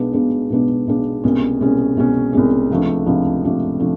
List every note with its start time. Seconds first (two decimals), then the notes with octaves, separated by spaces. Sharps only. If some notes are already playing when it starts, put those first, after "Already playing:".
Already playing: B1 B2 G#3 B3 D4
0.13 B1 B2 G#3 B3 D4
0.50 B1 B2 G#3 B3 D4
0.87 B1 B2 G#3 B3 D4
1.24 C2 B2 G#3 C#4
1.60 C2 B2 G#3 C#4
1.96 C2 B2 G#3 C#4
2.33 C2 B2 G#3 C#4
2.70 C#2 C3 F3 A3 D4
3.06 C#2 C3 F3 A3 D4
3.43 C#2 C3 F3 A3 D4
3.80 C3 F3 A3 D4